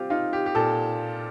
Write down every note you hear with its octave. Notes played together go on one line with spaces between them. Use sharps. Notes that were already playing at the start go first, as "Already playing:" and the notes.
Already playing: G3 C4 F4 G4
D#4 F4
G4
G4
A#2 A4